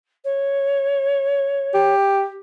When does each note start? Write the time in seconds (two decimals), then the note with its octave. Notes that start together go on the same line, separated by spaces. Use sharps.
0.24 C#5
1.74 G4